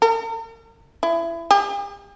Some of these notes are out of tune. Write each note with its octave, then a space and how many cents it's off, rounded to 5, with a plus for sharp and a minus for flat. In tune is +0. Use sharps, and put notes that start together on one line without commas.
A#4 -45
E4 +25
G4 +40